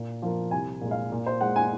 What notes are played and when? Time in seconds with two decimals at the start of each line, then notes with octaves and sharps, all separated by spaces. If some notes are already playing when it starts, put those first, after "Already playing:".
Already playing: A#2
0.22 F3 A#3
0.51 C2 G#5
0.81 A#2 G#3
0.91 F5
1.12 A#2
1.26 C5
1.41 G#3 F#5
1.56 G#5